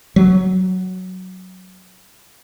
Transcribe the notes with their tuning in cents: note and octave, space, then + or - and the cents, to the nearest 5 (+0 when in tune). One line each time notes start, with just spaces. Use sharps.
F#3 +5